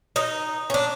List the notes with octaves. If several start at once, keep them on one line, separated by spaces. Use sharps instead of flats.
D#4
C#4
D4